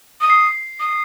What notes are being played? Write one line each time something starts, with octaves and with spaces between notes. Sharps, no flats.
D#6
C7
D#6